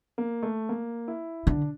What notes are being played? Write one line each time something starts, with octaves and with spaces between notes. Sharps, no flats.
A#3
A3
A#3
E4
D3 D4